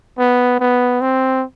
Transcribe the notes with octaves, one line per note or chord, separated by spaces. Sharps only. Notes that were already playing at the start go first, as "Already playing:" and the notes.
B3
B3
C4